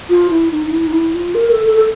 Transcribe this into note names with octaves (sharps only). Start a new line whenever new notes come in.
F4
E4
D#4
D#4
E4
D#4
E4
F4
A#4
A4
A4
A4